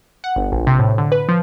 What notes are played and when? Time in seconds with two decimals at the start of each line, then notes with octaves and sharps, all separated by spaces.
0.24 F#5
0.36 G1
0.52 A#1
0.67 C3
0.79 A2
0.98 D3
1.12 B4
1.29 F3